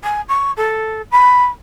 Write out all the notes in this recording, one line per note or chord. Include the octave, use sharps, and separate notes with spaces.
G#5
C#6
A4
B5